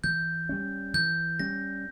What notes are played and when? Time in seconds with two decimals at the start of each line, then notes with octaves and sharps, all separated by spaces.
0.04 E3 G6
0.49 G3 C#4
0.94 E3 G6
1.39 G3 C#4 A#6